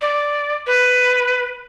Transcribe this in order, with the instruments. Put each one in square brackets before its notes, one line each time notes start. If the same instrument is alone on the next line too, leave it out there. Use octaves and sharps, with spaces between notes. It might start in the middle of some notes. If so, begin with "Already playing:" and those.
[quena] D5
B4